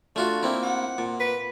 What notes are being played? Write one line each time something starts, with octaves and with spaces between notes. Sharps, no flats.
A3 D4 F4 F#4
A#3 C4 E4
F#5
A#2
B4